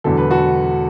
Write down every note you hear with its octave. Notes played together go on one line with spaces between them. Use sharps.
E1 E2 D3 F#3 A4
B4
F#4 A4